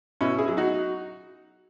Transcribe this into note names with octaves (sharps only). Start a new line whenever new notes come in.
B2 C#4 E4
E4 G#4
F#3
D#4 F#4